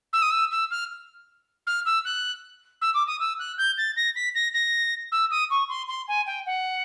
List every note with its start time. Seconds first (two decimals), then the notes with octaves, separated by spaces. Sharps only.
0.13 E6
0.22 D#6
0.31 E6
0.51 E6
0.71 F6
1.67 F6
1.86 E6
2.05 F#6
2.81 E6
2.94 D6
3.07 D#6
3.20 E6
3.39 F#6
3.58 G6
3.78 A6
3.96 A#6
4.16 B6
4.35 A#6
4.54 A#6
5.12 E6
5.31 D#6
5.50 C#6
5.69 C6
5.88 C6
6.08 G#5
6.26 G5
6.46 F#5